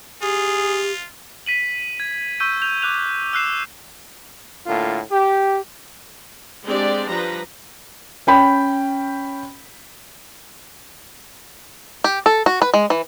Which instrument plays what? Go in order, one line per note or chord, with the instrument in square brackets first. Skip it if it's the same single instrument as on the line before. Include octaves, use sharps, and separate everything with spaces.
[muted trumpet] F4 [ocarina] G4 [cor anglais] G#4
[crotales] B6 D#7 F#7
G#6
C#6 E6 G6 D#7
G6 F7
D6 F#6 F7
E6 F#6 C7 E7
[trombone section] A2 D3 A#3 F4
G4
[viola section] G#3 C4 D4 G4 D5
F3 G3 B4 A#5
[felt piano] C#4 G5 B5
[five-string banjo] G4
A4
F#4
B4
G#3
E3